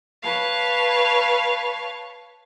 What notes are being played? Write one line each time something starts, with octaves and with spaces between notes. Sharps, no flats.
B4 C#5 F5 A5